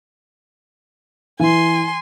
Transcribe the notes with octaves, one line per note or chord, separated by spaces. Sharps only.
E3 G#5 C6